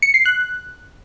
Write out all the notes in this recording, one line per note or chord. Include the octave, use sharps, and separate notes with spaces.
C#7
C7
F#6